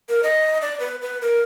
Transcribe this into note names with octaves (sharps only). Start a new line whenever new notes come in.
A#4
D#5
D5
B4
B4
A#4